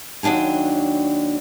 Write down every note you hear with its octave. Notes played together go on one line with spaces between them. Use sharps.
D#2 F#3 D4 G5 G#5